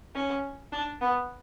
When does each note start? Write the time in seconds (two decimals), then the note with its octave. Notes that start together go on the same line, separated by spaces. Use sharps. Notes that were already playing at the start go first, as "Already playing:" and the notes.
0.15 C#4
0.72 D4
1.01 B3